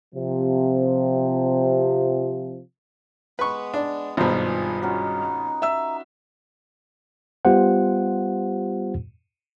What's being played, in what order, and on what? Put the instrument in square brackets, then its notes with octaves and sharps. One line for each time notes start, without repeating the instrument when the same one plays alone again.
[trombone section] C3 F3
[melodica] G#3 B3 [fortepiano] B4 C#6
[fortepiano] D4
[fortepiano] G#1 B2 [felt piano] G2 [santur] F3 D#4 B4
[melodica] G#4
[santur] C#4 F#4 [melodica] D#4
[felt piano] E5 E6
[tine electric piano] G3 B3 F4 G4 C5 F#5